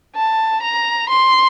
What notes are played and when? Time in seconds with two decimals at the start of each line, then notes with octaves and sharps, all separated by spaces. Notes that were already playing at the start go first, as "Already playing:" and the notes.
0.16 A5
0.63 A#5
1.09 C6